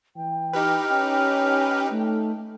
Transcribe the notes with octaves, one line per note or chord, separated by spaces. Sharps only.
E3 G5
D#4 G4 B4 F6
C#4
A3 D#4